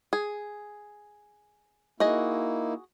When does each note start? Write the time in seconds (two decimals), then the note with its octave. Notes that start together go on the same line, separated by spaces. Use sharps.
0.13 G#4
2.00 A#3 D#4 E4 F#4 G#4 D#5